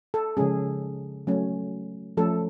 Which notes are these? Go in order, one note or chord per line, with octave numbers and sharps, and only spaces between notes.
A4
C#3 F3 G#3 C#4 G#4
F#3 A3 C#4
F3 A3 C#4 A4